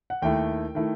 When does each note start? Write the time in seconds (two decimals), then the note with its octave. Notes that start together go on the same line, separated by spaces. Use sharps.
0.10 F#5
0.22 D#2 D#3 A3 E4 G5
0.75 D#3 A3 E4